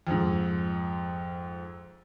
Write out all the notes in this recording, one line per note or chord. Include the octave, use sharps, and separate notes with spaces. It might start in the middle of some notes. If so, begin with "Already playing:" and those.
F2 G#2